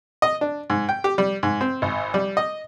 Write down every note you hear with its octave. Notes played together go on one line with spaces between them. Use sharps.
D#5
D4
G#2
G5
G4
G3
G#2
C4
G#1
G3
D#5